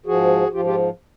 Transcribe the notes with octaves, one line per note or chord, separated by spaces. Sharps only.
G#2 F3 F#4 G#4
G#2 F3 F4 G4
F4 G4